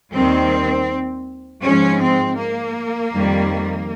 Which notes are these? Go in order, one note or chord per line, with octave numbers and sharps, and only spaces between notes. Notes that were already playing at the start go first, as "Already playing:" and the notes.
D#2 D#3 G3 C4
G#2 F3 G#3 C#4
C4
A#3
F2 D#3 G3